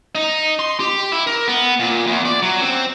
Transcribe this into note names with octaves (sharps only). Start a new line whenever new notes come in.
D#4
C6
G4
E4
A#4
B3
A#2
E2
D5
F#3
C4